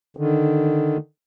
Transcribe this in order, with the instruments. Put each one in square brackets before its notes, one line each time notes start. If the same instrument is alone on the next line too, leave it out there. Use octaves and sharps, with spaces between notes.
[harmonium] D3 D#3